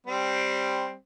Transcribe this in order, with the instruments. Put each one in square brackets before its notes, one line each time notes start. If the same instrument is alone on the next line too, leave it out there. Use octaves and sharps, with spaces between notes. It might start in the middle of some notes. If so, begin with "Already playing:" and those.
[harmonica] G3 C4